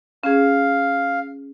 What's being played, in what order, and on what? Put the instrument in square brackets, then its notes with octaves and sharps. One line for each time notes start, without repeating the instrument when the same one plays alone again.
[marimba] C#4 G#4 [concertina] F5